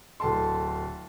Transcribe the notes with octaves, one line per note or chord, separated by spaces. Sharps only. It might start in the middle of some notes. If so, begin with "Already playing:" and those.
D1 A4 A5 C6